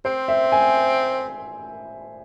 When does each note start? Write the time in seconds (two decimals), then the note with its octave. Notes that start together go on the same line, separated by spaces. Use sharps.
0.05 C4 C5
0.28 E5
0.52 G#5